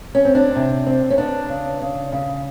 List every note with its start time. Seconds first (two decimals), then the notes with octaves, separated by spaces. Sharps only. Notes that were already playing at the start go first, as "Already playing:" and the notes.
0.15 C#4
0.25 C4
0.35 D4
0.56 C3
0.86 C4
1.10 C#4
1.18 B3 D4
1.49 C#3
1.81 C#3
2.12 C#3